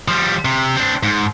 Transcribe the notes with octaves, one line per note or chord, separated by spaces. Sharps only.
F3 G3
C3
C4 D4
G#2